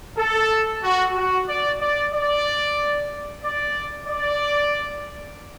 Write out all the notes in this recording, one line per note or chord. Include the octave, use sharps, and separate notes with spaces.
A4
F#4
F#4
D5
D5
D5
D5
D5